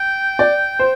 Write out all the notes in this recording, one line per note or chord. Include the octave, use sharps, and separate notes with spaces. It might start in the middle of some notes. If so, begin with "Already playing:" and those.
Already playing: G5
D5
C5